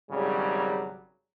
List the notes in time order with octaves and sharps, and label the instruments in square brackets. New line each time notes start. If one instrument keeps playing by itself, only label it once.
[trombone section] G#1 C#3 F#3 G3